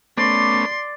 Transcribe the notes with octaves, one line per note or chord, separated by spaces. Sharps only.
A3 B3 C#4 D5 C6